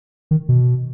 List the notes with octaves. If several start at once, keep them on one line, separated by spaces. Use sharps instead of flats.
D#3
B2